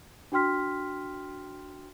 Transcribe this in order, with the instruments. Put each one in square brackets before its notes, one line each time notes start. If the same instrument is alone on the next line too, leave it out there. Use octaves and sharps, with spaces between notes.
[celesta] D4 F#4 G5 C6 F6 B6